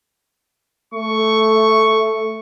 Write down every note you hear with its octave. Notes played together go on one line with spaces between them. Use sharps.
A3 C#6